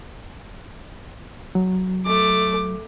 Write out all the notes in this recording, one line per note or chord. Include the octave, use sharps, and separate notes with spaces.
F#3
A3 D6